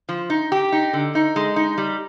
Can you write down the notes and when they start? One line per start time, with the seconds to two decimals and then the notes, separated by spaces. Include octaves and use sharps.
0.09 F3
0.30 D#4
0.52 G4
0.72 D#4
0.93 D3
1.15 D#4
1.36 G#3
1.56 D#4
1.78 G3